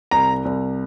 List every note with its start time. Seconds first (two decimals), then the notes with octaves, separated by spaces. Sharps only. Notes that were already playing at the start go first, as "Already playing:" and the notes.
0.11 C2 A#5
0.45 C2